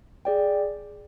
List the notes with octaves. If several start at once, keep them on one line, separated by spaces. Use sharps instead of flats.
G#4 D5 G5